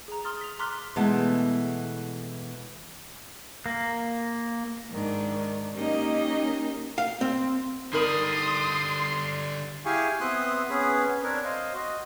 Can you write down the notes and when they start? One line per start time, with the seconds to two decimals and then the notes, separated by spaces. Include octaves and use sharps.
0.08 G#4 A#5
0.24 C6 D#6 F6 A6
0.41 B6 F7
0.59 A#5 C6 D6 F6 F#6 B6
0.96 B2 E3 G#3 A3 B3
3.66 A#3
4.90 G#2 D#3 D4
5.76 A#3 C#4 D#4 G4 A#4 D#5
6.98 F5
7.21 C4
7.93 D3 G3 D#4 A#4 B5 C6 D#6
9.85 E4 G4 G#4 F5 G#5 C#6
10.21 B3 C4 E5 C6 D#6 F#6
10.69 B3 C#4 G#4 B4
11.23 C4 D4 A#4 C#5
11.44 C5 D#5 F5
11.74 F#4 D#5